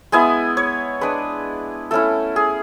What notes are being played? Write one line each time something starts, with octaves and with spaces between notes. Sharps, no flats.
G#3 B3 E4 G#5
C#5
G#3 D4 B4
A3 C#4 E4 A4
G#4